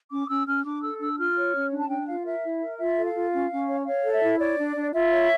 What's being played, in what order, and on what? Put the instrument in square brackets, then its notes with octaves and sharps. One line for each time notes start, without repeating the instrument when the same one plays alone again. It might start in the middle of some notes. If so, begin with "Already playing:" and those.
[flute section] C#4 D6
C#4 E6
C#4 F6
D4 D6
A4 E6
D4 E6
F4 F6
C#5
C#4
D4
A5
D4 G5
F4 F5
A#4 E5
E4
A#4
F4 E5
A4
F5
F4
C#4
C#4
C#5
C#5 F5
A4
E5
E4
C#5 D5
D4
D4
F4 E5
C#5